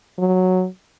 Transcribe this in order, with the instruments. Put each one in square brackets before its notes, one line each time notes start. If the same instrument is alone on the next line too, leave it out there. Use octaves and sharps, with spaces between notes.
[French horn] F#3